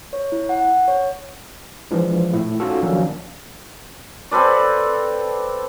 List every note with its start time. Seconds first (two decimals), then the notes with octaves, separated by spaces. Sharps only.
0.13 C#5
0.32 E4
0.49 F#5
0.88 C#5
1.91 E3 F3 G#3 D4
2.33 A#2 A3 E4
2.60 C#4 D#4 F4 F#4 A4
2.83 D#3 F3 F#3 A#3 C#4 D4
4.31 C4 A4 B4 D5